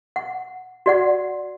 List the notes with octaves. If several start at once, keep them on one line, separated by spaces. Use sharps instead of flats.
F#5
F#4 D5 F#5